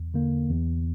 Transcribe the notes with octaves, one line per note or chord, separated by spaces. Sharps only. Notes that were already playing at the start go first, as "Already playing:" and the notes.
Already playing: E2
D3 A#3
E2